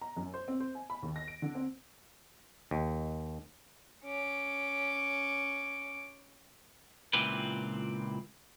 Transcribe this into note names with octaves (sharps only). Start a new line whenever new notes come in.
A#5
F#2
C5
C4
C5
G#5
B5
D#2
A#6
D7
D3
C4
D#2
C#4 D6
C#2 A#2 E3 C4 G4 B4